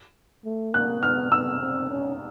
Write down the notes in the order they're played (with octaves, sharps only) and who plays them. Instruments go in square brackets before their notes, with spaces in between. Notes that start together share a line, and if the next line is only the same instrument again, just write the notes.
[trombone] A3
[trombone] A#3 [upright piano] F#6
[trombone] B3 [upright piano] F6
[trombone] B3 [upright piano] E6
[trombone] C4
C#4